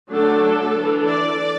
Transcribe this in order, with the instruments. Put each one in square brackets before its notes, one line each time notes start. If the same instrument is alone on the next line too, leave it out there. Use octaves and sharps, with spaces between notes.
[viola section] D3 F#3 A3 D4 A4
E3 D4
D5